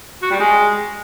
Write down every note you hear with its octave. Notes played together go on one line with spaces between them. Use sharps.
F#4
G3
G#3